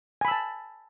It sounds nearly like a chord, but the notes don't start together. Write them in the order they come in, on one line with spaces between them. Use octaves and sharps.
G#5 B5 E6 A5